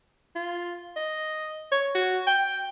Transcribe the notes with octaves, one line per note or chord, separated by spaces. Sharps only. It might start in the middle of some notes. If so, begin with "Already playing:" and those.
F4
D#5
C#5
F#4
G5